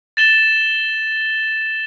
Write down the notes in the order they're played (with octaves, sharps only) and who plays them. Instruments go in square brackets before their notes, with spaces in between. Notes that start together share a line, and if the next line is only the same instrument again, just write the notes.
[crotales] A6 E7 G7